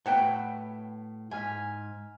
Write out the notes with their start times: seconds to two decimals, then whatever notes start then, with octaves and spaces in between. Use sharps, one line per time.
0.06 A2 F#3 B3 F#4 G5
1.31 G#2 G#5 F6 B6